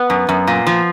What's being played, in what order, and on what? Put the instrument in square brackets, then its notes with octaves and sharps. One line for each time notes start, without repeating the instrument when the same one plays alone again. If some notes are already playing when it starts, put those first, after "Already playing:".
Already playing: [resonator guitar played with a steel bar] B3
F#2
F#2
A#2
F3